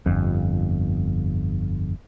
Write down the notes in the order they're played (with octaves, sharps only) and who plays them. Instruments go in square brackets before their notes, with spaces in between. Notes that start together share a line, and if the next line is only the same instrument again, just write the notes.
[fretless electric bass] G1 F2